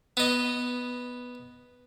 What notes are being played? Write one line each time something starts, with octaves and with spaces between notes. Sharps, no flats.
B3 D#5